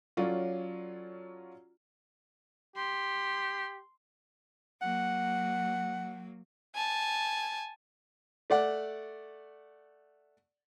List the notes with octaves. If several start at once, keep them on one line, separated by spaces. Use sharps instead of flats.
F#3 C#4 F4 A4 D5
G4 C6
F#3 A#3 F#5
G#5 A5
A3 D5 F#5